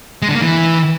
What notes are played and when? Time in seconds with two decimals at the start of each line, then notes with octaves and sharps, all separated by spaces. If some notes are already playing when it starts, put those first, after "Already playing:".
0.22 G#3
0.29 D3
0.35 A#3
0.41 E3